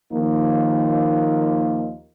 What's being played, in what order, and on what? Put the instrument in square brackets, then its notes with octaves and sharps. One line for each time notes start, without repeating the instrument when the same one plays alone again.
[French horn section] D#2 D#3 F3 A#3 D#4